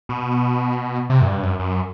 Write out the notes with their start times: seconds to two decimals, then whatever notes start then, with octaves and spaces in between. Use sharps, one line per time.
0.09 B2
1.10 C3
1.22 F#2
1.26 G2
1.43 F#2
1.59 F#2